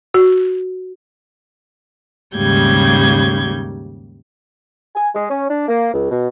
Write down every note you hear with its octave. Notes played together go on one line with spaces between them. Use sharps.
F#4
D#2 G#2 C#3 G3 G6 G#6
G#5
G#3
C#4
D4
A#3
C#2
B2